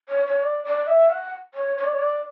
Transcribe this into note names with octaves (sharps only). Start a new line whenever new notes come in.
C#5
C#5
D5
D5
E5
F#5
C#5
C#5
D5
C#5
D5